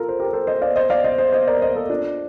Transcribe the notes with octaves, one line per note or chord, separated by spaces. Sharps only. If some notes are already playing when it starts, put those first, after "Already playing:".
Already playing: F4 A4 A#4
C5
G4 A#4
A4 C5
C5 D#5
D5 F5
C5 D#5
D5 F5
C5 D#5
C5 D#5
C5 D#5
A#4 D5
C5 D#5
A4 C5
D4 F4